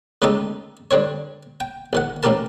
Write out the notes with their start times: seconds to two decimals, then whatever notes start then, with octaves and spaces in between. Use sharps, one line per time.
0.22 C#3 G#3 A3 D#4 G4 A4
0.91 G2 D3 C4 C#5
1.60 G5
1.93 A#1 D#3 F#5
2.23 A1 A2 A3 G4 A#4 A5